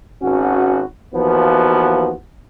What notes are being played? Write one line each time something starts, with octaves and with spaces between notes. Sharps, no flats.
G#1 C#4 F#4
D#2 E3 F3 B3 F#4